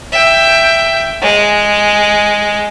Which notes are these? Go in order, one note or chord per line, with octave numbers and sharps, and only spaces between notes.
E5 G5
G#3